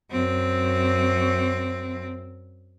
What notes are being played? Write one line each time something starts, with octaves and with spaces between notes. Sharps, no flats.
F#2 C4